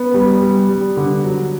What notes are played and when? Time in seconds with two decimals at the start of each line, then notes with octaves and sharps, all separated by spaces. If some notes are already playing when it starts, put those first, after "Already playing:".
Already playing: B3
0.14 G3
0.42 G3
0.69 G3
0.97 D3
1.24 F#3